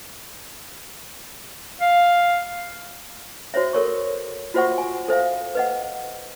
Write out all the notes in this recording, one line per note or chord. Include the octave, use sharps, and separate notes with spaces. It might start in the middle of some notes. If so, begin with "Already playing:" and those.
F5
F#4 C5 C#5 E5
A4 A#4 C#5 C#6
F4 F#4 C5 E5 F#5 C#6
G#5
A4 C5 E5 F5
B4 D#5 F#5